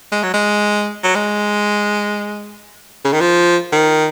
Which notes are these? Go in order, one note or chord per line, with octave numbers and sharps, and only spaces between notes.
G#3
F#3
G#3
F#3
G#3
C#3
D#3
F3
D#3